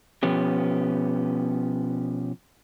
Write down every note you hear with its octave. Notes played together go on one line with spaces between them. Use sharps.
B2 F3 B3 C#4 G4